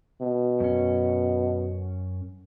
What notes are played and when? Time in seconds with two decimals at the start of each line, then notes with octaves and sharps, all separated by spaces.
0.21 B2
0.60 F#2 C#4